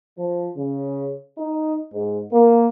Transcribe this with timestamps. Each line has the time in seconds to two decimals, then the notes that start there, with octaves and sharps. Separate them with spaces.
0.18 F3
0.56 C#3
1.38 D#4
1.93 G#2
2.32 A#3